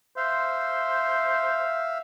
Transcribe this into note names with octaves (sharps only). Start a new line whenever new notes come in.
C5 E5 F5